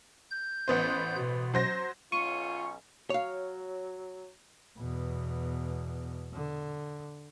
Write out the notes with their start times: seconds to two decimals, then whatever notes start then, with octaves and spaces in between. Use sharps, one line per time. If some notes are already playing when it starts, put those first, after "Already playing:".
0.31 G6
0.68 A1 B3 C5
1.18 B2
1.54 F#3 C5 A#6
2.12 B1 C#4 F4 C#6 D#7
3.10 F#3 C#5 F5
4.77 E2 B2
6.33 D3